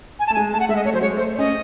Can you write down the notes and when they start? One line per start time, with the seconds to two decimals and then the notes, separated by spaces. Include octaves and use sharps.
0.20 G#5
0.27 A5
0.30 A3
0.34 G#5
0.37 G#3
0.53 A3 A5
0.60 F#5
0.69 G#3 E5
0.76 D#5
0.85 A3 C#5
0.93 F#3 C5
1.01 G#3 C#5
1.17 A3 C5
1.35 C#5
1.38 C#4 D#5